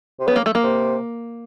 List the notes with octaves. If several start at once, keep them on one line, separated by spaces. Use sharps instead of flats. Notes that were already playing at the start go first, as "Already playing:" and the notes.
C3
C#3 B3
A#3
A3
A#3
C3